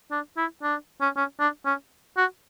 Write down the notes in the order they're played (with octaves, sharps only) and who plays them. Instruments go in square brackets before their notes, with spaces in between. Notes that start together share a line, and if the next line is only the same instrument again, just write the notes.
[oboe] D4
E4
D4
C#4
C#4
D4
C#4
F#4